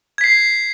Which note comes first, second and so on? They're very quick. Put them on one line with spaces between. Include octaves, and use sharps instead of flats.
G#6 B6 C7